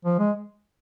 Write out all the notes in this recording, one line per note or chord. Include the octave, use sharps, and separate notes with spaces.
F3
G#3